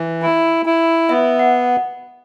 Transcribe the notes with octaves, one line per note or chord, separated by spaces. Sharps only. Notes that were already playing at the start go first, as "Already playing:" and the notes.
Already playing: E3
E4
E4
B3 E5
F#5